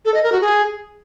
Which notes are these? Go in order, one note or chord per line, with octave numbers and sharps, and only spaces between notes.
A4
D#5
A#4
F#4
G#4